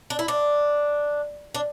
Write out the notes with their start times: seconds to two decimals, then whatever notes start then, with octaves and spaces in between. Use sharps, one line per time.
0.10 D4
0.19 E4
0.28 D4
1.54 D4